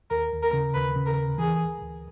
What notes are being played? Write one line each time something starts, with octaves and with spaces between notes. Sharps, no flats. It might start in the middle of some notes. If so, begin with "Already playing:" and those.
D#2 A#4
D#2
A#4
C#3
D#2 B4
C#3
A#4
D#2
E3 G#4
D2
D2